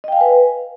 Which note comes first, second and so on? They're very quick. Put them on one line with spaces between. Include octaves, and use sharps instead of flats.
D#5 G5 F5 G#5 B4